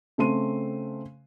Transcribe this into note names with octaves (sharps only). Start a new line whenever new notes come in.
C#3 A3 C4 C6 D#7